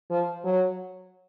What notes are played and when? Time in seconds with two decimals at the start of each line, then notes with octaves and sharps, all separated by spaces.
0.11 F3
0.45 F#3